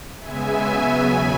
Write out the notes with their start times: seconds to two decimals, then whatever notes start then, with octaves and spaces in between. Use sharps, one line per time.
0.18 C#3 G#3 B3 E5 G#5
0.61 C#3 F#3 B3
1.04 E2 B2 F#3 G#5 B5